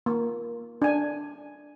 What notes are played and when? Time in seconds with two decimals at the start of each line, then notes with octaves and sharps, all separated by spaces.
0.06 A#3
0.82 D4 G#5